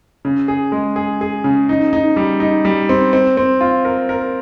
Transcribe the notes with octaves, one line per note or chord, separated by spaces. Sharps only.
C#3
G#4
G#3
G#4
G#4
C#3
D#4
D#4
G3
D#4
G3
C4
C4
C4
F4
A#4
A#4